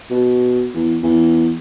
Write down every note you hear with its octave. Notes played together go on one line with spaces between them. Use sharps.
B2
E2
E2